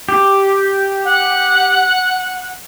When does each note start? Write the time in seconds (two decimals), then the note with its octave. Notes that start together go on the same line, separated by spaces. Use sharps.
0.09 G4
1.05 F#5